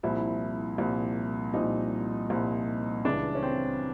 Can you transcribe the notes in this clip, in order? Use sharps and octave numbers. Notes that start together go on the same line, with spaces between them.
C2 A#2 F3 E4
C2 A#2 F3
C2 A#2 F3 D#4
C2 A#2 F3
C#2 C#3 E3 D4
C#4
C4